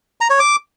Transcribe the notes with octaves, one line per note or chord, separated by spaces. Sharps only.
A#5
C#5
D6